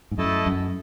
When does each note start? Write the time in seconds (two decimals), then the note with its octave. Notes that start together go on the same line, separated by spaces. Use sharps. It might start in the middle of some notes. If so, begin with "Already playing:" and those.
0.11 G#2
0.18 F#2 A3 E4 A4 D#5 A5
0.46 F#2